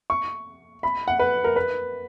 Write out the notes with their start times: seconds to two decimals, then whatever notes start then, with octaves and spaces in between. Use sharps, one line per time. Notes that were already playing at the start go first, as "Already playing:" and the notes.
0.10 C#6
0.83 B5
1.08 F#5
1.19 B4
1.44 A#4
1.56 B4